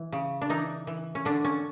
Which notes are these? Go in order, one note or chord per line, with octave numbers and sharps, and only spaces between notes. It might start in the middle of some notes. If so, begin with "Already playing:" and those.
Already playing: E3
C#3
D4
E3 D#4
E3
C#4
D3 D4
C#4